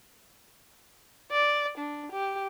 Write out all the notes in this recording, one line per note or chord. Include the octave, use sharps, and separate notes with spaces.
D5
D4
G4